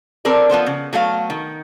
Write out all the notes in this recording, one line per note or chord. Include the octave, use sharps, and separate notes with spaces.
C4 A4 A#4 D5
F3 B3 A4 C5
C#3
F#3 A3 B3 F5
D#3